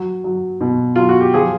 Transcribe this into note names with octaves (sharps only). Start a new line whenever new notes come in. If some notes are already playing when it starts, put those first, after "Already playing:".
Already playing: F#3
F#3
B2
F#3 F4
F#4
G4
F3 G#4